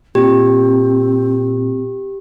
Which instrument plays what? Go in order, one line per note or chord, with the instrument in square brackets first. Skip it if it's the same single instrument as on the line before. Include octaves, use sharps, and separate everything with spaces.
[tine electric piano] A#2 [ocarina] C4 [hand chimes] G4